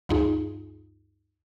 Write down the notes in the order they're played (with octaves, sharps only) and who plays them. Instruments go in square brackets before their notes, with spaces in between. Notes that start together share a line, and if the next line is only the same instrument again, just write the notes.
[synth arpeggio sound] D2 G2 D#4 F4 G#4